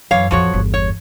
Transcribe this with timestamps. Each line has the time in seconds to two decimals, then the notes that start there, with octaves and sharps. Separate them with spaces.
0.11 F#2 E3 C#5 F5
0.31 A1 F2 F3 F#4 C#5
0.53 G1 E2
0.74 C#5